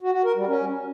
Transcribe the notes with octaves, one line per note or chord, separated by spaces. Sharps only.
F#4
F#4
A#4
G3
C#4